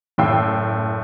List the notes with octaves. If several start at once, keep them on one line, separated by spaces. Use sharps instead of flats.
F#1 A2 G5 E6 C7